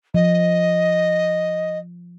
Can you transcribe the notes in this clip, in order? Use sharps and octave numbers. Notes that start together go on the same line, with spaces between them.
F3 D#5